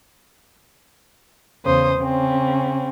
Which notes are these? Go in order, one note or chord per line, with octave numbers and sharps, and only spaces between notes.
E2 C#3 C5 D#6
C#3 C4 C#4